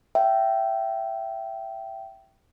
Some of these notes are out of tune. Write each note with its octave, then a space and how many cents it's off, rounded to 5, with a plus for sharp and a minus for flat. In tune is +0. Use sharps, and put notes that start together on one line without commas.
E5 +15 G5 -15